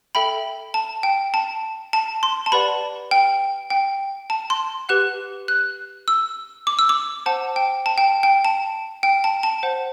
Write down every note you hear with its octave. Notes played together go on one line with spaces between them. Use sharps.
A4 E5 G5 B5
A5
G5
A5
A5
C6
A5
G4 B4 D5 F#5 B5
G5
G5
A5
C6
G4 B4 F#5 F#6
F#6
E6
D6
E6
D6
C5 F#5 A5
G5
A5
G5
G5
A5
G5
A5
A5
C5 F#5